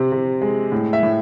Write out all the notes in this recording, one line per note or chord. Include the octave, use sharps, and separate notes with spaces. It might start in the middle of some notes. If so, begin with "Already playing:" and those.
Already playing: C3 C4
C3
G#3
A2
E5
A2